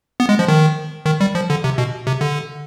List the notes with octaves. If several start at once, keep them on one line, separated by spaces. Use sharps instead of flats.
B3
G#3
F3
D#3
D#3
G3
F3
D3
C3
B2
C3
D3